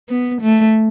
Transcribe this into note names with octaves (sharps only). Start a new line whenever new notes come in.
B3
A3